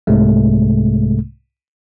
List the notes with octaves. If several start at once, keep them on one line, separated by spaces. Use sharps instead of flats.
C2 G#2 C3 G#3 A3